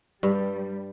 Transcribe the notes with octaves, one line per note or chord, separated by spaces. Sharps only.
G2 G3